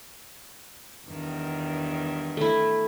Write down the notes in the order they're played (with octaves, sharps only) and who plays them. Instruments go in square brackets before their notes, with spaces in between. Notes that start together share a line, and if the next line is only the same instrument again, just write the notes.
[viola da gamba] E2 G2 D#3
[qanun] A3 E4